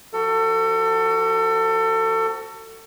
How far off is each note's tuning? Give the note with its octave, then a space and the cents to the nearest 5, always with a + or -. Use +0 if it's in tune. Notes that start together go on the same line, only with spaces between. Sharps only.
F3 +0 F#4 +20 A4 +30